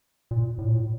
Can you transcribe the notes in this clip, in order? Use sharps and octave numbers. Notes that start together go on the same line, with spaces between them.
A#2
A2
A#2
A2